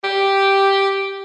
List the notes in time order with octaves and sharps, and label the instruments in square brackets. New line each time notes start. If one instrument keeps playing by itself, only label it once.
[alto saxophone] G4